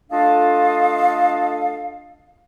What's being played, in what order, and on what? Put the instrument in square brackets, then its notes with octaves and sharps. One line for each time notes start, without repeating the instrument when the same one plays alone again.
[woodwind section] A3 D4 F4 A4 D#5 F5